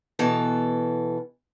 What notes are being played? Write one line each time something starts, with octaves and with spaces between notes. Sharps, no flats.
B2 E3 A4